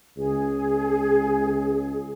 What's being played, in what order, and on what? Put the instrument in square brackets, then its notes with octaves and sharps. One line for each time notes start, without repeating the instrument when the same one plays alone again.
[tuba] C#2 [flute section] G#4